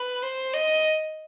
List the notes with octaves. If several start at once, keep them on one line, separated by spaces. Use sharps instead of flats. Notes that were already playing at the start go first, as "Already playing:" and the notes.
Already playing: B4
C5
D#5